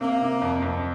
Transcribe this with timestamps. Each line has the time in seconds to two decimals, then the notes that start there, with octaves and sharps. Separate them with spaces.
0.01 C3 A#3
0.21 C3
0.42 F2
0.62 F2